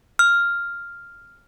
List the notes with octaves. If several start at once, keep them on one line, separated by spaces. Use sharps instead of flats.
F6